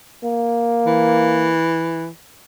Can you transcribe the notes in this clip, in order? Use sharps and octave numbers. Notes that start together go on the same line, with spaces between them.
A#3
E3